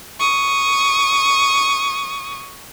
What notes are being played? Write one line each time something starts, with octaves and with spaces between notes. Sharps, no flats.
C#6 D#6